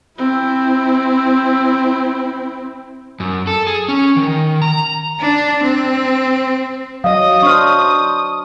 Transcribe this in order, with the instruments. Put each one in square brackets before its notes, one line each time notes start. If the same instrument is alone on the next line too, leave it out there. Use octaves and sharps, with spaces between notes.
[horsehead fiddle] C4 E4
[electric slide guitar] F#2
A4
G#4
C#4
D#3
A#5
[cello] D4
C4
[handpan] F#3 D#5 [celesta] F5 [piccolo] D#6
[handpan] D4 C5 [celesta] C#6 F6